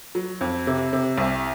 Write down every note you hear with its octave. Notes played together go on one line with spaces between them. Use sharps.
F#3
F2
C3
C3
C2